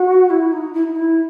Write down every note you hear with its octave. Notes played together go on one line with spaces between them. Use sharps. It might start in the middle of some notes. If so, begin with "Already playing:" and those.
Already playing: F#4
E4
D#4
E4
D#4
E4